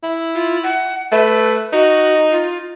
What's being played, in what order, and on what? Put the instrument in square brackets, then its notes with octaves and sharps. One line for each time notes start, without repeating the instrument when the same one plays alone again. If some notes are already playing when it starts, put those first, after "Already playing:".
[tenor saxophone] E4
[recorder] F4
F#5
[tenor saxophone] A3 [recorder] B4
[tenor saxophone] D#4 [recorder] F#4
[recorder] F4